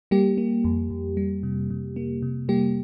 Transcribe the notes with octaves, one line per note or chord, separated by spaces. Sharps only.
G3 A#3 G4
A#3
F2
F2
G3
C3
C3
A#3
C3
G3 A#3 G4